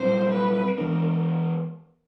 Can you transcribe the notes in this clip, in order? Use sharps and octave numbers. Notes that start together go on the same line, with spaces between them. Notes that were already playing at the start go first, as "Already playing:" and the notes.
Already playing: A#2 G3 C4 C5
B4
E3 G#3 B3 D4 A#4